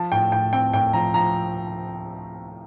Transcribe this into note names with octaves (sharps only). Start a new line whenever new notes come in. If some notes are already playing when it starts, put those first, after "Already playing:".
Already playing: F3 A5
A2 G5
A2 G5
C4 G5
A2 G5
F3 A#5
F3 A#5